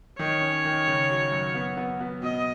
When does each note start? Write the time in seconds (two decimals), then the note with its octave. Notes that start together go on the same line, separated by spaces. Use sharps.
0.19 D#3 C#5
0.41 C#4
0.65 D#3
0.87 C#3
1.09 F#3
1.32 F#2
1.55 B3
1.77 B3
2.01 B3
2.22 B2 D#5